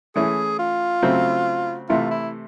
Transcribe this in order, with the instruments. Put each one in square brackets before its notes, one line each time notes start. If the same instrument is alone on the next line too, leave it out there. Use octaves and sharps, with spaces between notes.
[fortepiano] E3 A3 C#4 [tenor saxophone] G#4
[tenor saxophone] F4
[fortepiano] C#3 F#3 A3 C4
[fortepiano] C3 E3 A3 [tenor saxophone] F4
[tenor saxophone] E4